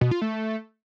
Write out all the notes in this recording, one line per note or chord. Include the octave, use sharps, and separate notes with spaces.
B2
F4
A3